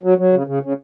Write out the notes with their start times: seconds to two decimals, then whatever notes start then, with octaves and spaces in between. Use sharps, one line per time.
0.03 F#3
0.18 F#3
0.33 C#3
0.47 C#3
0.63 C#3